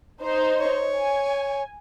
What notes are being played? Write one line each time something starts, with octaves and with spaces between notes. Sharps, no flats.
D#4 C5
C#5
G#5